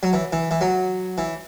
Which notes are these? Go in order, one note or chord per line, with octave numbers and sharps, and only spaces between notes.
F#3
E3
E3
E3
F#3
E3